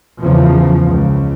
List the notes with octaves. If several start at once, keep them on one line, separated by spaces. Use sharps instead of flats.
E2 C#3 F3
C#2 C#3